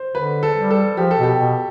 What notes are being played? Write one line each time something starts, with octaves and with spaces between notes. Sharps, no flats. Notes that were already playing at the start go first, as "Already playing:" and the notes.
Already playing: C5
D3 B4
A4
G3
A4
F3 G4
A4
B2 G4
B2